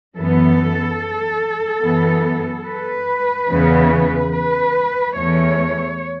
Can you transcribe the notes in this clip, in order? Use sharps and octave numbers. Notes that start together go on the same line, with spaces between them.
F#2 E3 B3 A4
F#2 E3 B3
B4
E2 C#3 E3 B3
B4
E2 E3 A3 C#5